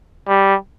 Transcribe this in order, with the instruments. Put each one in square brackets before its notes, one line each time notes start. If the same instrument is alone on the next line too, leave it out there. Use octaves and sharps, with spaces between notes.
[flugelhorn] G3